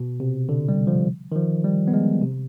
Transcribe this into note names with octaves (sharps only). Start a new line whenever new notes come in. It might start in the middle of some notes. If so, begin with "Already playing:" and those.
Already playing: B2
C3
D3
G3
F3
D#3
F3
G3
B3
G#3
C3